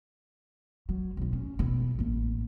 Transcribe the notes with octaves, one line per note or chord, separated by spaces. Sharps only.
F#3
B1 D#4
C#4
B1 E4
A1 A#3